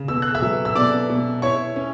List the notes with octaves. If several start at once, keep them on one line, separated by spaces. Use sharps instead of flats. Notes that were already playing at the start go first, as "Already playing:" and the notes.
Already playing: C#3
B2 E6
F#6
E5 E6
F#3
E6
B2 D5 D6
B2
E4 C#5 C#6
C#4